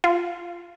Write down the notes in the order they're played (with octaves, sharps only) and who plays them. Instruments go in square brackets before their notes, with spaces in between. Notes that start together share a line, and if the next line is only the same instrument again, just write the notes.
[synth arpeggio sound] F4